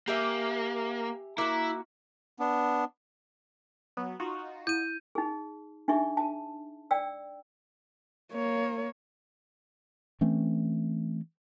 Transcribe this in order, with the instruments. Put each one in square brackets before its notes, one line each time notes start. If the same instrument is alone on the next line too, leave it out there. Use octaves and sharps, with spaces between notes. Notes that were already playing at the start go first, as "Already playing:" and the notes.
[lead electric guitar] A#3 [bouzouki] G4 E5 G#5
[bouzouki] A#3 F#4 [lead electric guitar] E4
[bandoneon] B3 D4
[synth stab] F#3 B3
D#4 F4 F#4
[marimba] E4 [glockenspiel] G6 D#7
[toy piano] D#4 G#4
D4 D#4 G#4 E5 C#6
A5
D5 G5 E6
[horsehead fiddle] A#3 C#5
[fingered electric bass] E3 A3 C4 C#4